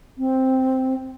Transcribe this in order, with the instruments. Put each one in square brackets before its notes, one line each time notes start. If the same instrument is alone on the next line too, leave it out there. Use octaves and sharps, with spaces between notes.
[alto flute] C4